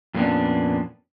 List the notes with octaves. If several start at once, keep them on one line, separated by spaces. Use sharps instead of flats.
F2 A#2 A#3 B3 C#4 D4